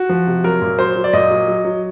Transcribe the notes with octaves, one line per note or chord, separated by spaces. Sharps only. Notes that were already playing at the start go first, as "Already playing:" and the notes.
Already playing: F#4
F3
C3
F#3 A#4
A#2
F#3 C5
F#3
D5
A#2 D#5
F#3
F#3
F#3